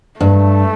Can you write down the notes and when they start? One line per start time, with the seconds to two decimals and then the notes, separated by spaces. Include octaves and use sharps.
0.20 G2 A3